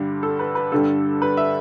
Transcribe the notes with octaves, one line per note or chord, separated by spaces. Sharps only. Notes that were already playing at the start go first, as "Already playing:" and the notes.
Already playing: G2 D3 G3
A4
B4
B4
G2 D3 G3 A4
B4
E5